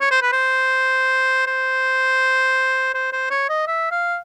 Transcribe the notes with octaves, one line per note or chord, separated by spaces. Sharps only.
C#5
C5
B4
C5
C5
C5
C5
C#5
D#5
E5
F5